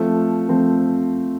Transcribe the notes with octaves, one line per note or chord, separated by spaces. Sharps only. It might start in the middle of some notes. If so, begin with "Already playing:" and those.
Already playing: F3 A3 C4
F3 A3 C4